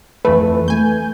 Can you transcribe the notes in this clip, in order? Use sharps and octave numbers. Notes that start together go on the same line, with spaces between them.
F2 E3 A3 B4
A3 G#5 G6